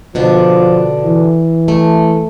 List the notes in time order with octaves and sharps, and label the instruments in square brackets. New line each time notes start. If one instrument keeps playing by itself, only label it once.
[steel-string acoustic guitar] B2 D3 D4 [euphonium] F3
[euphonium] E3
[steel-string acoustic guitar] A3